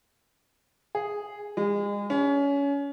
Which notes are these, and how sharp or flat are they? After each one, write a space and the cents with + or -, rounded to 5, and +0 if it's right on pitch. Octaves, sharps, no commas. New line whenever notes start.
G#4 -5
G#3 -35
C#4 +25